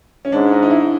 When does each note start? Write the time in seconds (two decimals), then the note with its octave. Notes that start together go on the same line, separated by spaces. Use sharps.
0.25 C#4
0.32 G#2 D4
0.52 D#4
0.62 D#4
0.70 E4